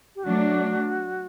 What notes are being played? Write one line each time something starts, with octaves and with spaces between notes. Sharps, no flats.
G4
F#3 A3 D4 F#4